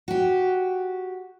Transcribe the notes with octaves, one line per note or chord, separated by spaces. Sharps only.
F#4 G4